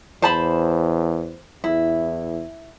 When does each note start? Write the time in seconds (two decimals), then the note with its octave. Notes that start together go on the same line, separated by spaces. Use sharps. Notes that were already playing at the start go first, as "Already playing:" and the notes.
0.22 E2 C5 A5 B5
1.64 E2 E4